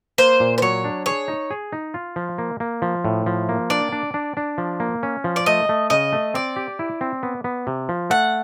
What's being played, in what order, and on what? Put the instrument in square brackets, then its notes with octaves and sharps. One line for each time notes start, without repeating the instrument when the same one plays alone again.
[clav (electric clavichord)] A#3 [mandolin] C5
[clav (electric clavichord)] A#2
[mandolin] C5
[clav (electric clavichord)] F#3 [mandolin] C#5
[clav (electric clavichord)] D4
[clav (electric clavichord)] G#4 [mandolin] C#5
[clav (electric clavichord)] D#4
G#4
D#4
F4
F3
A#3
A#3
F3
A2
F3
A#3
[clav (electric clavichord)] D4 [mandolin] D5
[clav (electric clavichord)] D4
D4
D4
F3
A#3
C#4
F3
[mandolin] D5
[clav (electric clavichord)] A3 [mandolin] D#5
[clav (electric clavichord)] A3
[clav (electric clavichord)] C#3 [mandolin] D#5
[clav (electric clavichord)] A3
[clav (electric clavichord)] C4 [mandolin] D5
[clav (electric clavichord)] G4
E4
C4
B3
B3
C3
F3
[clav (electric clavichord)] A3 [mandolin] F#5